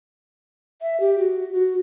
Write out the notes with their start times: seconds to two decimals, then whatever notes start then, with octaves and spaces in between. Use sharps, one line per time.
0.82 E5
1.00 G4
1.19 F#4
1.53 F#4